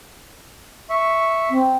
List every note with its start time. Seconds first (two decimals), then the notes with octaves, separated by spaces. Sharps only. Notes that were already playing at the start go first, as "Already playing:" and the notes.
0.90 E5 C#6
1.51 C4